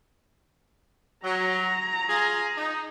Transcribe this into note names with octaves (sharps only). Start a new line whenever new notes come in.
F#3 A#5
F4 G#4
D#4